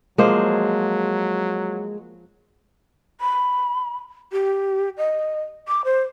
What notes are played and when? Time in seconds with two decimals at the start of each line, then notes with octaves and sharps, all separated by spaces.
0.18 F3 F#3 G#3 A#3 C5
3.21 B5
4.32 G4
4.98 D#5
5.68 D6
5.85 C5